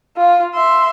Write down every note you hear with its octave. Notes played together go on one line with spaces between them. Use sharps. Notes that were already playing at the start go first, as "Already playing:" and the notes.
F4 F5
E5 C6